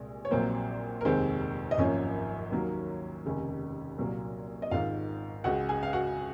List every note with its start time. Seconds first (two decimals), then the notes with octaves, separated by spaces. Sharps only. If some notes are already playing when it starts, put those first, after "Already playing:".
Already playing: C2 A#2 G#3 G#4
0.25 C#5
0.31 A#1 A#2 F#3 A#3 C4 C5
1.01 A#4
1.05 F1 D#2 D#3 G#3 C4 C5
1.71 D#5
1.78 G#1 F#2 F3 A#3 C#4 C#5
2.51 D#2 D#3 F#3 A#3
3.24 F1 D#2 C#3 G#3
3.98 C2 A#2 F#3 A#3
4.62 D#5
4.71 G#1 G#2 D#3 F4 F5
5.44 C#2 C#3 G#3 F#4 F#5
5.69 G#4 G#5
5.83 F5
5.93 F#4 F#5